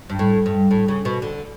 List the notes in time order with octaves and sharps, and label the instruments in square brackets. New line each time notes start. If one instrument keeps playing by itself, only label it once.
[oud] G2
A2
G2
A2
C#3
B2
D3